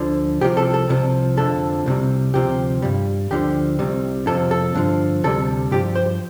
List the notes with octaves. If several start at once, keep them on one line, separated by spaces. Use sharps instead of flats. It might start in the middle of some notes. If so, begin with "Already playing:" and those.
Already playing: D2 D3 F3
C2 C3 F3 G4
A4
A4
C2 C3 F3
F2 D3 F3 A4
C2 C3 G3
D2 C3 F3 G4
G2 G3
D2 D3 F3 G4
C2 C3 G3
F2 C3 F3 A4
A4
G2 D3 F3
D2 C3 G3 A4
G2 F3 G4
C5